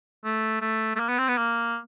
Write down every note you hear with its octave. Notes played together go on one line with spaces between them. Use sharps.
A3
A3
A3
A#3
B3
C4
B3
A#3